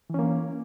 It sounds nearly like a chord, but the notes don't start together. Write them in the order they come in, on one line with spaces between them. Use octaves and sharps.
E3 C#4 A#3